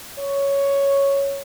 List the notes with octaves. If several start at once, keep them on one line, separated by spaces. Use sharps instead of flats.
C#5